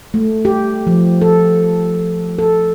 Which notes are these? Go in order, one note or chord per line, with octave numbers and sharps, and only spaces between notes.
A3
G4
F3
A4
A4